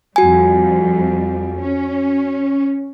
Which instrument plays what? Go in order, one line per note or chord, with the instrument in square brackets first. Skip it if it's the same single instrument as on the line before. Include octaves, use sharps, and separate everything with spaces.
[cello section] F2 G3 [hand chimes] F#4 G#5
[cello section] C#4